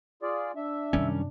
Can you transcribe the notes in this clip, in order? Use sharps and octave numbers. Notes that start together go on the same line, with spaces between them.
F4 G#4 D5
D4 E5
F#2 C3 D#3 G3 C#4